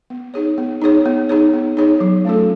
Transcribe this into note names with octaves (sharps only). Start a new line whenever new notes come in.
B3
D#4 G#4 C#5
B3
D#4 G#4 C#5
B3
D#4 G#4 C#5
B3
D#4 G#4 C#5
F#3
A3 C#4 F4 A4